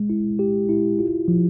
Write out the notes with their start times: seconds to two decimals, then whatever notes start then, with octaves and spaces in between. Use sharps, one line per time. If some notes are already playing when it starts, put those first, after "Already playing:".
Already playing: G#3
0.10 E4
0.39 G4
0.69 E4
0.99 F4
1.28 F3